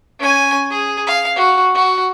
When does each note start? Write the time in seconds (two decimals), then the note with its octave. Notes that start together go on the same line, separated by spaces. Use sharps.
0.19 C#4 G#5
0.71 G#4
1.07 F5
1.36 F#4
1.75 F#4